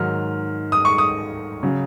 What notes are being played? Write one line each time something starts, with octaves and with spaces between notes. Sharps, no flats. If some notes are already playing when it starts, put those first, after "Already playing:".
Already playing: G#2 D#3 F#3 F6
D#6
C#6
D#6
C#3 F#3